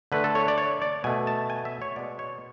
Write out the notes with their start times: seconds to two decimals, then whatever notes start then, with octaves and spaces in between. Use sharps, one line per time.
0.12 D3 A3 B4
0.24 A4
0.35 C#5
0.48 D5
0.58 C#5
0.82 D5
1.04 B2 A3 G#5
1.27 A5
1.50 G#5
1.65 E5
1.82 C#5
1.96 B2 G#3 D5
2.19 C#5